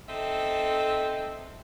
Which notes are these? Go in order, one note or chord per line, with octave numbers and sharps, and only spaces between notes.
C4 D#4 A4 E5